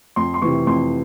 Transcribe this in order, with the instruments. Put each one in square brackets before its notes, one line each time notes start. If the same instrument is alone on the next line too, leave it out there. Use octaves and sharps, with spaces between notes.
[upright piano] F2 C6
C6
C3 E3 C#6
F2 C6